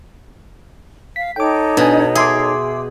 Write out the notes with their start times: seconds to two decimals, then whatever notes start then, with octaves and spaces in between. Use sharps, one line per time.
1.16 F5 B6
1.36 D#4 A4 C#5 G5 D6
1.77 B2 D4 D#5 G#5
2.15 G#4 E5 C6 D6